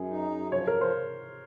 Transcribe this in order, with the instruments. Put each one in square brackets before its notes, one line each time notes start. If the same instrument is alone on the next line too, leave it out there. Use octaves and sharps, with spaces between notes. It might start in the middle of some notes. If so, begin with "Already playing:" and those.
Already playing: [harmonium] F#2 [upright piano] G#4
[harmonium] D#4
F#2
[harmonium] F3 [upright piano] C#5
[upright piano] A#4
[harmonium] F3
[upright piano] C5